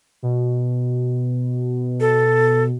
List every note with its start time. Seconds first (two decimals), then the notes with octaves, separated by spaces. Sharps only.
0.23 B2
2.00 A4